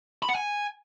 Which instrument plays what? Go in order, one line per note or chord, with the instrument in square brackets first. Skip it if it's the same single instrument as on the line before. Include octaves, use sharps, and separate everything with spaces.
[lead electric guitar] B5
F#5
G#5